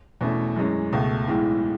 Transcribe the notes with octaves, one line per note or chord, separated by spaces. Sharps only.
E2 B2 A3 C#4
F#2 E3 G#3 C#4
C#2 B2 A3
B1 A2 E3 G#3